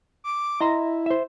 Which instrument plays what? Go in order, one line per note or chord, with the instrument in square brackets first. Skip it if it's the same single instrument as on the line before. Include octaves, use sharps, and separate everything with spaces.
[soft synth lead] D6
[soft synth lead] E4 [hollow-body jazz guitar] D#5 A#5 C6
[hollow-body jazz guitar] C5 E5